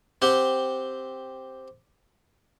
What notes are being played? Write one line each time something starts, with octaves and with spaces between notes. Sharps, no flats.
C4 G4 F#5